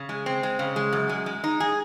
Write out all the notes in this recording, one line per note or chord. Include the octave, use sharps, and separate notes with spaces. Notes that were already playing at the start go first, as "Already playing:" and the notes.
Already playing: C#3
G#3
C4
G#3
C#3
G#3
F#2
G#3
G#3
D#4
G#4